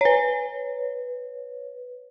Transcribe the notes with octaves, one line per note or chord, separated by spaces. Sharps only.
B4 C#5